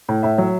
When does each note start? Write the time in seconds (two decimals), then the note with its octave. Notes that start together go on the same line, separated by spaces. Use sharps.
0.09 A2
0.23 A2 E5
0.38 F#3